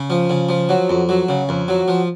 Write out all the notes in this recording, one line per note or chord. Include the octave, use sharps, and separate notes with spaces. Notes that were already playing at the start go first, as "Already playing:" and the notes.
Already playing: C#3
F3
C#3
F3
F#3
F2
F#3
C#3
F2
F#3
F3